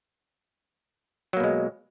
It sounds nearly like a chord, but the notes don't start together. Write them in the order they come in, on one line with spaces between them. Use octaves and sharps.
F#3 A#3 B2 G#3